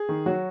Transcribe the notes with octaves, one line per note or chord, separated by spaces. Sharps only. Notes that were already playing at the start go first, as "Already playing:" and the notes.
Already playing: G#4
D#3
F#3 F#4